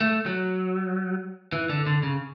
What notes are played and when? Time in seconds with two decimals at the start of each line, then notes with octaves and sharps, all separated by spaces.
0.01 A3
0.26 F#3
1.52 E3
1.69 D3
1.86 D3
2.03 C#3